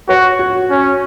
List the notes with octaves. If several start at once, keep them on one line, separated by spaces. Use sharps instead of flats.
F#4 C#5
F#4
C#4